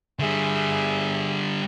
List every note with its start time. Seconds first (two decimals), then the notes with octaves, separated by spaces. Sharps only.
0.19 D3 G3 G#4 E5